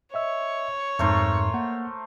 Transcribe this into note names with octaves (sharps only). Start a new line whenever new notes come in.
C#5 D#5 E5 E6
F2 G#2 A3 A#4 C5
A#3 F#5